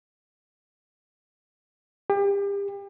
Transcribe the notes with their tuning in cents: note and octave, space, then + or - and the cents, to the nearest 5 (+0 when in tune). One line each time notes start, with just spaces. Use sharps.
G4 +35